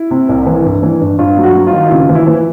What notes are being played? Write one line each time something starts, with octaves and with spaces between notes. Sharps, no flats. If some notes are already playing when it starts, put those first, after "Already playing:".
Already playing: E4
C3
C2
E3
G2
E3
G2
G2 F4
F#3
F#4
F#3
F4
D#3
E4
C#3 F4
E3
E4
E3